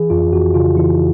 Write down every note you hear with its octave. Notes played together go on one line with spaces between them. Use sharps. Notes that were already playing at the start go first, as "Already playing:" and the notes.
Already playing: E3 G#4
F2 F4
F2 F#4
C#3 F4
E3 E4